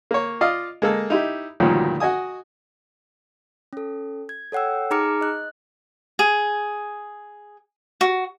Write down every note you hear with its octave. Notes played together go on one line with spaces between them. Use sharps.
A#3 C#5
F4 D5 D#5 F5
G#3 A#3 A4
D#4 E4 G4
D2 G2 A#2 D#3 F3 F#3
F#4 D#5 G#5 D#6
C#4 A4
G#6
A4 C#5 F#5 G5 E6
D#4 G#4 A#5 D6 F6 C#7
D#5 F#6
G#4
F#4